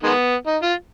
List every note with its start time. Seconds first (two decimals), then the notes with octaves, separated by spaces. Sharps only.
0.03 D#3 G#3 B3
0.47 D#4
0.62 F4